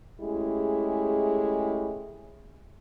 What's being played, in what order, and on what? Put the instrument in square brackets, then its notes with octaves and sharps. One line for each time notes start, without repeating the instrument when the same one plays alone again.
[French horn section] G#3 A3 C#4 E4 G4 G#4